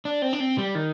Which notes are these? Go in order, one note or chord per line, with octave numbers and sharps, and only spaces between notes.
D4
C4
D4
C4
G3
D#3